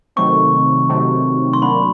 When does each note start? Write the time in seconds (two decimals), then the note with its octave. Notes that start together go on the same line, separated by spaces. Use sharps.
0.16 C3 D#3 F#3 A3 C4 C#6
0.89 C3 D#3 F#3 A3 C4
1.53 C6
1.62 F#3 A#3 D4 B5